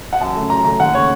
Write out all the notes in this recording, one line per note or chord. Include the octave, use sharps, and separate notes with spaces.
F#5
F#2 A5
C#3 A3
F#2 A#5
C#3 A3 A#5
D#2 F#5
C#3 A3 C#5